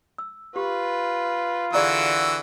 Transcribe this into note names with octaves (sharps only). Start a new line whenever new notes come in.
E6
F4 G4 B4
D3 E3 F#4 G#4 D5 A#5 E6